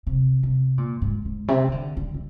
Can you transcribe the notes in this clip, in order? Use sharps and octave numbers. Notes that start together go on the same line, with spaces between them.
C3
C3
A#2
G#2
G#2
C3
D#3
D3
D3
D3